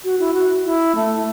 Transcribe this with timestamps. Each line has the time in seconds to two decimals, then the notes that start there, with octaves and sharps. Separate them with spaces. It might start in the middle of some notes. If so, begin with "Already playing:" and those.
0.04 F#4
0.19 E4
0.34 F#4
0.65 E4
0.95 A3